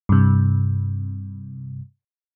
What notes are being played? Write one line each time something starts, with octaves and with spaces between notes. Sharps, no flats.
G2 C3